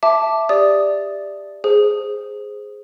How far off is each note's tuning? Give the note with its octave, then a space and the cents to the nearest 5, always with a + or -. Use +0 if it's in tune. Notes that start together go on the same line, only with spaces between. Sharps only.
E5 +0 A5 +0 D6 +0
G4 +20 D5 +0 D#6 +0
G#4 +0 C5 +0